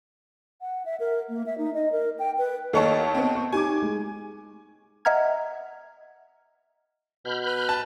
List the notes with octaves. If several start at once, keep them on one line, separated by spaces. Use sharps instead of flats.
F#5
E5
A#4
A#3
E5
D#4
D#5
A#4
G5
B4
D#2 A4 C#5 D#5 A5 C#6
B3 C4
C#6
D#4 G4 G#5 D6
G#3
D#5 E5 F#5 A#5 F6 G#6
B2 B5 F6 G6
B4
A5